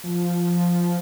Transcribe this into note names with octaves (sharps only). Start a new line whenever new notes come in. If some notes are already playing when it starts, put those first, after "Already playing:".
F3